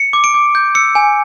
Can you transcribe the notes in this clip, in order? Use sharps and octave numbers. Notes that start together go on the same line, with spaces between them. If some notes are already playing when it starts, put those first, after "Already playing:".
Already playing: C#7
D6
D7
D6
G6
E6 C#7
G#5